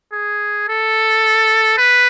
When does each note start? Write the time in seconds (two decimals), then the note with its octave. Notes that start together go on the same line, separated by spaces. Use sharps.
0.13 G#4
0.69 A4
1.78 B4